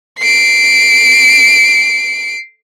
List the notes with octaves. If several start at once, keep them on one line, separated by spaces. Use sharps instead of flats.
C7 D7